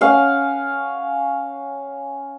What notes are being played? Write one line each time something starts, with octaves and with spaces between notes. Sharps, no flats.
C#4 F5 F#5